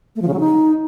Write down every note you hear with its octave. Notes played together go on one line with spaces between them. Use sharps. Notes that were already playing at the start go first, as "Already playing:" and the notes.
A3
F3
C#3
F#3
D#4